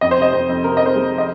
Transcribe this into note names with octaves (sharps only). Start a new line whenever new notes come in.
F2 D#5
C5
C3 D#5
F2 C5
F2
C3 A#4
C3 D#5
C5
G#3
D#5